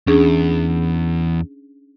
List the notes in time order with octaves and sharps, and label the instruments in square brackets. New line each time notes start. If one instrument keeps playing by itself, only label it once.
[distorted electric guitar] E2 [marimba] C#4 D4 G#4